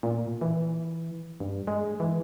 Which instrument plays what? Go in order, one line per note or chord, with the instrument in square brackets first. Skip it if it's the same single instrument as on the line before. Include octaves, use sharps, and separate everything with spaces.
[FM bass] A#2
E3
G2
G#3
E3